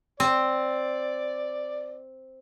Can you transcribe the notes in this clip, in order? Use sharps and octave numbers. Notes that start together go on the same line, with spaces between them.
C4 D5